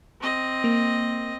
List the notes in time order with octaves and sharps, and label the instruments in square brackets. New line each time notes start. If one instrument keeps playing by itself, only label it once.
[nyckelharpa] C4 D#5
[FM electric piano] A#3